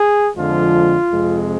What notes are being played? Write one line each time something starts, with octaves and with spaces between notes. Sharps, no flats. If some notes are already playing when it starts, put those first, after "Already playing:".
Already playing: G#4
F2 D3 F3 G#3 F4
F2 C3 G#3